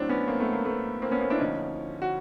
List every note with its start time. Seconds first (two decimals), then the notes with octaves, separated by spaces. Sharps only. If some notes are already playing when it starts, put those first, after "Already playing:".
Already playing: A2 F#3 C4 D4
0.09 B3 C#4
0.28 A#3 C4
0.40 A3 B3
0.53 A#3
0.65 A3 B3
1.02 A#3 C4
1.11 B3 C#4
1.21 A#3 C4
1.30 D4 E4
1.39 D2 D3 F3 C#4 D#4
2.02 F#4